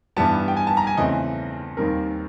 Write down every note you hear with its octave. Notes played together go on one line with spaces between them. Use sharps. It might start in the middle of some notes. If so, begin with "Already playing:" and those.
G2 E3 G3 B3 A5
G5
G#5
A5
A#5
G#5
E2 C#3 E3 A3 C4 D#5
D#2 D#3 G3 C4 A#4